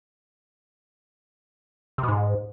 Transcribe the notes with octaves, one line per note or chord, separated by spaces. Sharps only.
C3
B2
G#2